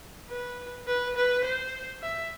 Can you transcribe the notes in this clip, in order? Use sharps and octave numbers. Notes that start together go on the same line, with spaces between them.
B4
B4
B4
C5
E5